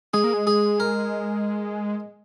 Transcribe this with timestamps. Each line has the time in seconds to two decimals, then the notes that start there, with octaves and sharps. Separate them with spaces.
0.14 G#3 G#4
0.24 A#3
0.33 G#3
0.47 G#4
0.80 A#4